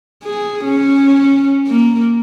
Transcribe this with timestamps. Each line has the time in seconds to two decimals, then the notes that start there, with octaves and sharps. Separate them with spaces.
0.24 G#4
0.65 C#4
1.67 A#3